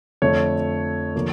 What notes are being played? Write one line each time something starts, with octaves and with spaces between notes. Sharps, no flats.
F2 D3 F3 A3 C#5
D3 F3 A#3